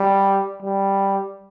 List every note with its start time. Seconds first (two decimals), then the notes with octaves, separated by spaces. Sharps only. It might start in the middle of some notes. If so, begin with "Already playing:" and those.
Already playing: G3
0.62 G3